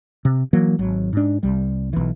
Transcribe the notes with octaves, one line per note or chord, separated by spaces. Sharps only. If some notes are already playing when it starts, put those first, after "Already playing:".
C3
E3 F#3 A#3
G#1 F#3
G#2 D4
C2 G3
B1 E3